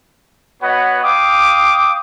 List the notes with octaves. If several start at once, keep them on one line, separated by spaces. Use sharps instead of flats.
B3 F#4 B4 C#5 D#5 F#5
F5 G5 D6 D#6